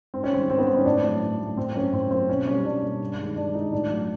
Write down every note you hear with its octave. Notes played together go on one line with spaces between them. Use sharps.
G#2 C4
C#4
D#3 G3 C4
G#2 C4
B3
D#3 G3 C4
C#4
A2 D4
F#3 A3
A2
F#3 A3
A2 C4
F#3 A#3 C#4
A2 C4
F#3 A#3 C4
B2 C#4
G3 A#3 C#4
B2 D4
G3 A#3
G2
D#3 G#3
G2 D4
D#3 G#3 D#4
A2 D4
F#3 A3